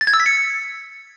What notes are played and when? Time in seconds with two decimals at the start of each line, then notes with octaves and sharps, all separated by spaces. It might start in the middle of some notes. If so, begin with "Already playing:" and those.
0.01 A6
0.07 G#6
0.14 E6
0.20 B6
0.26 C#7